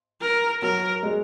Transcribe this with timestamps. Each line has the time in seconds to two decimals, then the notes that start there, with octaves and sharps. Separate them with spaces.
0.21 A#4
0.62 F#3 A#4
1.03 G#3